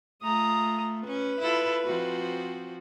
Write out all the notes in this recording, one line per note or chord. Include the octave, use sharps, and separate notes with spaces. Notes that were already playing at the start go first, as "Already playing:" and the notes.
A3 F4 A#5 D#6
C#4 B4
E4 F4 A4
F3 C4 F#4